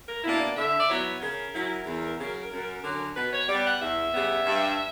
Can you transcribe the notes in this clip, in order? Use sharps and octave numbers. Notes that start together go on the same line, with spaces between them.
A#4
B2 A#3 D4 E4
D5
D3 E5
D5
F#3 B3 E4 C#5
C#3 A#4
F#3 C#4 E4
E2
C#3 F#3
F#2
D3 F#3 C#4
B2 B4
C#5
G3 B3 D5
F#5
E2 E5
C#3 G3 B3
G2